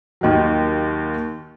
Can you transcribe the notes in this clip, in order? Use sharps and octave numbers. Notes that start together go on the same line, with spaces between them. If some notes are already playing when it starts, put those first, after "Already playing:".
D#2 D#3 F#3